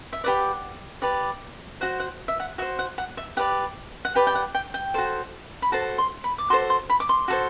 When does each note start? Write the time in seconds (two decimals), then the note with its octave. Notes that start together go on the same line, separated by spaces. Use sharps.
0.13 E5
0.24 G4 B4 D5 F#5
1.02 G4 B4 D5
1.81 F#4 C5 F#5
2.00 F#5
2.28 E5
2.40 F#5
2.58 F#4 E5
2.62 C5
2.79 F#5
2.98 F#5
3.17 E5
3.37 G4 B4 D5 F#5
4.05 F#5
4.15 G4 B4 D5 G5
4.27 G5
4.35 F#5
4.55 G5
4.74 G5
4.94 F#4 A4 C5
5.62 B5
5.72 F#4 A4 C5 A5
5.98 C6
6.24 B5
6.38 D6
6.50 F#4 A4 C5 C6
6.70 C6
6.90 B5
7.00 D6
7.09 C6
7.28 F#4 A4 C5